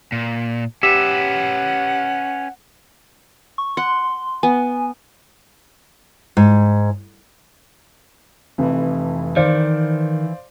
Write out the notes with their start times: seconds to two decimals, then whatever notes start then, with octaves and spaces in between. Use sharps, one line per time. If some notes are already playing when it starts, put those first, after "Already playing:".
0.12 A#2
0.83 C#4 G4 B4 E5 F#5
3.58 C#6
3.77 F#5 C6
4.43 B3 G#5
6.37 G#2
8.58 F1 F2 E3 B4
9.36 D#3 C5 D5 F5